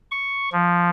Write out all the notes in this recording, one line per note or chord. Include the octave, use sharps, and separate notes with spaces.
C#6
F3